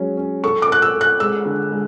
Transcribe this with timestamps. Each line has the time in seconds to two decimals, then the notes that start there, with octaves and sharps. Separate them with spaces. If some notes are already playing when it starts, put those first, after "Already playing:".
Already playing: F#3 G#3 C#4
0.17 C#4
0.44 A4 C#6
0.62 D6
0.69 A4 F#6
0.82 E6
0.95 A4
1.01 F#6
1.20 G#3 E6
1.45 D3
1.71 G#3